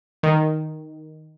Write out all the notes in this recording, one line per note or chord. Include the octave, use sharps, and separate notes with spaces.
D#3